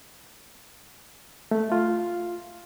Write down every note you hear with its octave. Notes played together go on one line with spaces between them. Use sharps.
A3
F4